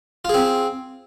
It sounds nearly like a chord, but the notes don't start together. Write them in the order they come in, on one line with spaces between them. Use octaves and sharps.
F4 G#4 C4